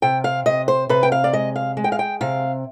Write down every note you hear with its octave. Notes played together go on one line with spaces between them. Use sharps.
C3 G5
F5
C3 D#5
C5
C3 B4
G5
F5
D5
G#3 D#5
F5
G#3
G5
F5
G5
C3 F5